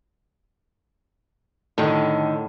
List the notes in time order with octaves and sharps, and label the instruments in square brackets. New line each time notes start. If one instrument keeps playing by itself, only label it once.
[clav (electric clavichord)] A2 [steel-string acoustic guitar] D3 D#3